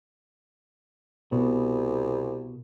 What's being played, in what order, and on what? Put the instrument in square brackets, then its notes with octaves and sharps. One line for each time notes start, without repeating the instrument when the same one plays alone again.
[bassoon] C2 [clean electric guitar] B2